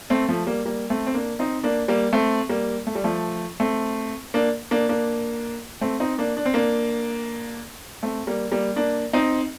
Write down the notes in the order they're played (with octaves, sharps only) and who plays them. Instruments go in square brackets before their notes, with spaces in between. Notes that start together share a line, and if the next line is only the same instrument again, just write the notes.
[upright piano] A3 C4
F3 A3
G3 A#3
G3 A#3
A3 C4
C4
A#3 D4
C4 D#4
A#3 D4
G3 A#3
A3 C4
G3 A#3
A3
G3
F3 A3
A3 C4
A#3 D4
A#3 D4
A#3 D4
A3 C4
C4 D#4
A#3 D4
D4
C4
A#3 D4
A3 C4
G3 A#3
G3 A#3
A#3 D4
C4 D#4